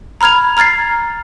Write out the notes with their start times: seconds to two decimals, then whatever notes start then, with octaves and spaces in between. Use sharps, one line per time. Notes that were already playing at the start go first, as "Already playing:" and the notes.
0.21 A#5 B5 F6 G#6 F7
0.57 A#5 F6 G#6 A6 C7